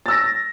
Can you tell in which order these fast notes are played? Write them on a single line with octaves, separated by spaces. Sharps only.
A6 E6 A#6